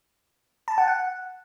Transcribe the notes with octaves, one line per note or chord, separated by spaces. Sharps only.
A5
F#5
F#5